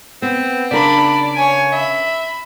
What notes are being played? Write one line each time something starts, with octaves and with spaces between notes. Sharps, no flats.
B3 C4
C#3 D4 A#4 D5 B5
C#5 G#5
E5 B5